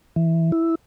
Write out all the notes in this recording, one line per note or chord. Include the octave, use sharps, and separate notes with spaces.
E3
E4